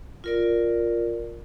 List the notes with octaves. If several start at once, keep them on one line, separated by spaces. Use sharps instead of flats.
F4 A#4 D5